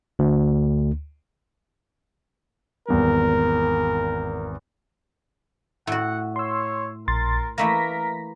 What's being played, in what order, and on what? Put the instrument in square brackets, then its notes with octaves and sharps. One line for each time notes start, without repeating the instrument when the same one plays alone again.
[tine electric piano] D2
[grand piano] G#1 E2 G3 [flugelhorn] A#4
[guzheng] A2 F#4 [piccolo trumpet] F#5
[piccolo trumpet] C#5 [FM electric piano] C6 E6
[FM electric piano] A#1 C6 A6 [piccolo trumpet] A#4
[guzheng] E3 A3 A#3 [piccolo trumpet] A#4 [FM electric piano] A#6 B6